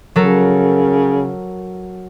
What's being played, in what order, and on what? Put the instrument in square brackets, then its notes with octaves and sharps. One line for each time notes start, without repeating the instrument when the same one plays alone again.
[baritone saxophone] C#3 [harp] F#3 A4 A#4